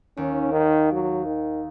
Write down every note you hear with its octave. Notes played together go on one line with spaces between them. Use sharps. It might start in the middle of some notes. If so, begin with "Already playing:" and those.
D#2 C#4
D#3
F#3
D#3